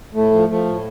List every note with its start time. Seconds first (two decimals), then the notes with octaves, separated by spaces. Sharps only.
0.14 A2 A3
0.31 F3
0.48 F3 A3
0.66 A2